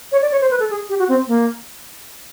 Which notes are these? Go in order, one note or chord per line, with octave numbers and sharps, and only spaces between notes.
C#5
D5
C#5
C5
B4
A4
G#4
G4
F#4
C4
A#3